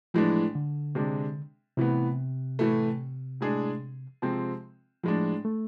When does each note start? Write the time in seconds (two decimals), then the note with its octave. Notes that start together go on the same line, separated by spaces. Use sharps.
0.14 A2 E3 F3 G#3 D4
0.55 D3
0.95 C3 G#3 D4
1.77 A2 C3 E3 B3
2.59 A2 E3 A3
3.41 A2 G#3 D4 G#4
4.22 C3 F3 G#3 C4
5.03 A2 F3 G#3 D4
5.45 A3